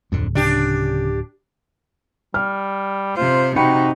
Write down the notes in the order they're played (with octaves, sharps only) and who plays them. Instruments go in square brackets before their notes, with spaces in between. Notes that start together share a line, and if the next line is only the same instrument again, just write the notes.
[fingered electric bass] D1 [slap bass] F2 D3
[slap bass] C#3 [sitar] D4 G4
[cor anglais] G3 [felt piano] F6
[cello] C3 C5 [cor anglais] F4
[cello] C3 D#4 [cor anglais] F#4 [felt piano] G5 B5 C#7